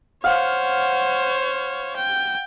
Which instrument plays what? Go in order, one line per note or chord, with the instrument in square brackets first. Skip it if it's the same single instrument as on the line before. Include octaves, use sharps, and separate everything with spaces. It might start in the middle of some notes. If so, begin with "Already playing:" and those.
[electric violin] C5 C#5 [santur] F5 F#5
[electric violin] G5